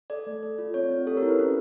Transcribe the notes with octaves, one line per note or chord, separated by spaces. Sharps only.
A4 D5
A3
A4
F4
C4 C#5
C4
G4 A4
A#4
E4
B4
C#4